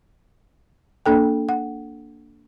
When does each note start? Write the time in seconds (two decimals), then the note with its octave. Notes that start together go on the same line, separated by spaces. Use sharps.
1.06 A#3 D4 A4 G5
1.49 F#5